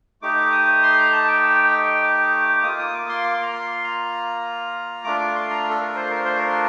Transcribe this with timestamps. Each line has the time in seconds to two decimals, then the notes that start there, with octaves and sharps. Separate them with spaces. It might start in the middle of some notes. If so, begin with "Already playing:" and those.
0.22 A3 D#4 G4 D6
0.52 D#6
0.83 C6
0.98 A#5
1.12 A5
1.28 G5
2.03 D6
2.63 A#3 F4 D#6
2.78 D#6
2.94 D6
3.09 C6
3.23 D6
3.34 C6
3.43 A#5
3.52 C6
3.84 A#5
5.04 A3 D4 F4 D6
5.20 D6
5.35 C6
5.51 A#5
5.70 A4
5.81 A#4
5.96 C5
6.10 A#4
6.25 C5
6.39 A#4